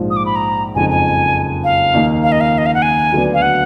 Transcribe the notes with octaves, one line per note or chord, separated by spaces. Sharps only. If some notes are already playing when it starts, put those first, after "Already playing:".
Already playing: A#1 G#2 F3
D#6
D6
B5
A#5
F#1 F2 F3 G#3 D#4 G#5
G#5
F5
D#2 D#3 A#3 D#4
F5
D#5
F5
D#5
F5
F#5
G#5
D2 D3 F#3 B3 D4
F5
F#5